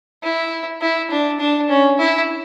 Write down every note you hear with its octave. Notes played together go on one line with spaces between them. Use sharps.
E4
E4
D4
D4
C#4
E4